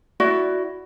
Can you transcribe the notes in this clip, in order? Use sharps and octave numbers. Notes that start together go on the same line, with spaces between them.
E4 F#4 D5